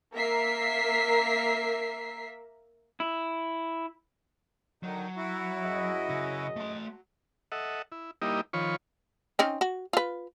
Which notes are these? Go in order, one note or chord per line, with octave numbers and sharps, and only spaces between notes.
A#3 A#4 E5 A#5 B6 C7
E4
D3 D#3 F#3 D#4
E4 F#4
F#2 G#4 D#5
C#3
F#3 A3 C6
A4 D#5 E5 F#5
E4
G3 A#3 D#4 E4 G4 D#5
D#3 F3 F4 C#5 B5 C#6
C4 C#4 D#4
F#4
F4 B4